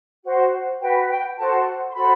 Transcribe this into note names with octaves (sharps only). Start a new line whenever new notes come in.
F#4 C5
F#4 B4 G5
G5
F#4 A4 C5 A5
C6
F#4 A4 C5 B5